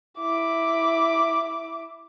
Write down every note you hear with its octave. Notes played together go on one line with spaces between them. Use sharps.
E4 D6